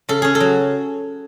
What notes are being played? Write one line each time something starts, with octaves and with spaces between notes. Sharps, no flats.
C#3 A4
C#4 G#4
A4
F#3